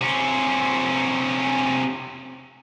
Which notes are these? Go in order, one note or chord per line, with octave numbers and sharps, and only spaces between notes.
C3 C#4